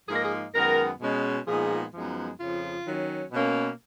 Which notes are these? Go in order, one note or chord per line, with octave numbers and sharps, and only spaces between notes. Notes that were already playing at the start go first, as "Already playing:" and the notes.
G#2 F3 A#3 D#4 G#4
A#4
G#4
F#2 D#3 G#3 B3 A#4
B2 G#3 C#4
A#2 F3 G#3 B3 D#4 G#4
F#2 F3 G#3 B3 D#4
F2 C#3 F3 F4
D#3 F#3 C#4
B2 A#3 C#4